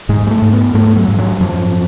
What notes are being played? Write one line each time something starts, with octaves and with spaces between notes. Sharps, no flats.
G#2 G#3
G#3
A3
G#2
B3
G#2 A3
F#3
G#2
F#3
F#2 F3